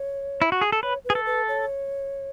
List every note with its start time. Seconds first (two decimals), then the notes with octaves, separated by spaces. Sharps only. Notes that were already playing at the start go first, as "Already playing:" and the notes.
Already playing: C#5
0.42 E4
0.52 F#4
0.61 G#4
0.72 A4
0.83 B4 C#5
1.05 B4
1.10 G#4
1.15 A4
1.26 B4
1.48 C#5